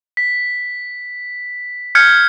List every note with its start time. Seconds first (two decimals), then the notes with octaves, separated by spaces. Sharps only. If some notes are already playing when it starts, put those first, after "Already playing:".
0.17 B6
1.95 F6 G6 G#6 C#7